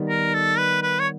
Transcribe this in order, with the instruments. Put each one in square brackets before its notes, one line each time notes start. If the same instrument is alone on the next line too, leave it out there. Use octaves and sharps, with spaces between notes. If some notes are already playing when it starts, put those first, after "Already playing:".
Already playing: [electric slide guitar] D#3 G3 B3
[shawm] A#4
A4
B4
B4
C#5